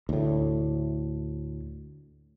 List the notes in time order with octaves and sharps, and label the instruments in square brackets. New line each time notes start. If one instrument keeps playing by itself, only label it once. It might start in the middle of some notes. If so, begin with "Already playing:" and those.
[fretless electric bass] D2 A2